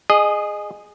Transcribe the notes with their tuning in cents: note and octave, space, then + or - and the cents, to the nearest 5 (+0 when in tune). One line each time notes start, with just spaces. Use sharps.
G#4 +0 D#5 -25